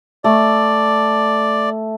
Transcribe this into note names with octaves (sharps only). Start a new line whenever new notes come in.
A3 D5